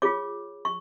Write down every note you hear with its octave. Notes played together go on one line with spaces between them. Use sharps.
F4 G#4 C#5 D6
C#6